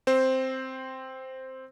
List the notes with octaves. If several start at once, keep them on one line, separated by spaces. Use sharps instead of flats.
C4 C5